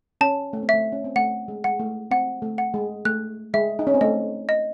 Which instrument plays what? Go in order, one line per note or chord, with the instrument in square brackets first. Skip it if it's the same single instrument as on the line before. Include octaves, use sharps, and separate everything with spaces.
[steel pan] C#4 [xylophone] A5
[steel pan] A3
C4
[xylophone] E5
[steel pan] A3
C#4
C4
[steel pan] A3 [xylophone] F#5
[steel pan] G#3
[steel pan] G#3 [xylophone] F#5
[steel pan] A3
[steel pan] C4 [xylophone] F#5
[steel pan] A3
[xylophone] F#5
[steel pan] G#3
[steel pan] A3 [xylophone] F#6
[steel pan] G#3 [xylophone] E5
[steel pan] D#4
C#4
C4
[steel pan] A3 [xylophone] D#5
[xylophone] D#5